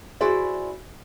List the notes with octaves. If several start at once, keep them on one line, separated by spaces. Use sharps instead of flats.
E4 F#4 G#4 C5 D5 E5